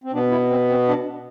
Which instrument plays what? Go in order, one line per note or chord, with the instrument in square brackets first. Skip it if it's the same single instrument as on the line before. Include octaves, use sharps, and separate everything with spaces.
[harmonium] C4
B2 B3 D4
E4
C4
C4
D4